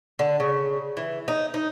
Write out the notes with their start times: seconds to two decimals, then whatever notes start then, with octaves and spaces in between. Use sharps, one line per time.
0.19 D3
0.40 C#3
0.97 E3
1.28 D#4
1.54 D#4